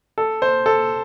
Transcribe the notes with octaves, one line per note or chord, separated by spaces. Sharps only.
A4
C5
A4